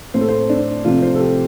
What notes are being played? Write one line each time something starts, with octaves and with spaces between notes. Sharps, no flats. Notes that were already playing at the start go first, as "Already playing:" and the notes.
A2 A3 C4 C5
A4
C5
D4
C3 F3 A3 C4 F4
C5
A4
G4